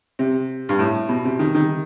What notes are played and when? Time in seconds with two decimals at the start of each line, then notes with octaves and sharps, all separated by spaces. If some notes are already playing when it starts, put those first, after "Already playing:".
0.19 C3
0.69 G2
0.79 A2
1.09 B2
1.25 C3
1.39 D#3
1.55 D#3